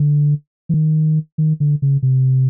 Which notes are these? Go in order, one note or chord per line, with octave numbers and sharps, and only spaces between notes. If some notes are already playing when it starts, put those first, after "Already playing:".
Already playing: D3
E3
D#3
D#3
D3
C#3
C3